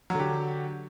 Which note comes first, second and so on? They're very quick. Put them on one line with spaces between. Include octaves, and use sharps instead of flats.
F#3 D3 G4